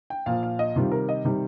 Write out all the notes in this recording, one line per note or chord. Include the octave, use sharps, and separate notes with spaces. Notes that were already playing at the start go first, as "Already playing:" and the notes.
G5
A#2 F3 F5
F5
D#5
C3 D#3 G3 F4
A#4
D#5
C3 D#3 G3